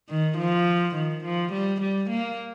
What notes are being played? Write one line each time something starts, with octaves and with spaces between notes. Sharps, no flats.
D#3
F3
D#3
F3
G3
G3
A#3